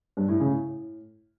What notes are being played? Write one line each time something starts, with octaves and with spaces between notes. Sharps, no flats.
G2
A2
C#3
A2